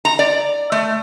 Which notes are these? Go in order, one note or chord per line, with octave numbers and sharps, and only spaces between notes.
A#5
D5
A3